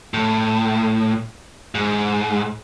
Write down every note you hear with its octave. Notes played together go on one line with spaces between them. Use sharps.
A2
G#2